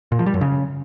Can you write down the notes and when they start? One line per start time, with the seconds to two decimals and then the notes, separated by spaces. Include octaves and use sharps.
0.12 A#2
0.19 F3
0.26 G3
0.34 F#2
0.41 C#3